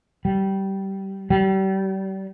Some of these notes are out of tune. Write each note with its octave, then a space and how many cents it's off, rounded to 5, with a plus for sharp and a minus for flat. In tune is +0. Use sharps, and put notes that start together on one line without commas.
G3 -20
G3 -35